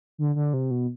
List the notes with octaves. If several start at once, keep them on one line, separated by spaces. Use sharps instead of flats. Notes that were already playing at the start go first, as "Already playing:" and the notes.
D3
D3
C3
B2